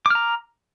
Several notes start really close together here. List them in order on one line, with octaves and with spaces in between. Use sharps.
D6 F6 A#5